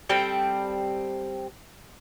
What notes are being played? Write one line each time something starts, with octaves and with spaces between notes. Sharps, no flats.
G3 C4 A4 G5